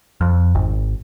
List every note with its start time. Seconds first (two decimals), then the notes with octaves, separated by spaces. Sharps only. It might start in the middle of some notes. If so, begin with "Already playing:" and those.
0.21 F2
0.55 G#1